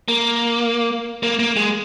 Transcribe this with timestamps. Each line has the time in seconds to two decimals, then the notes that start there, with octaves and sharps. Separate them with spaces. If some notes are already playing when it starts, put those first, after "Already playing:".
0.08 A#3
1.23 A#3
1.39 A#3
1.57 G#3